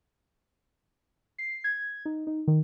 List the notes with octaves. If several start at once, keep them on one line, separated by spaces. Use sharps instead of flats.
C7
G#6
D#4
D#4
D#3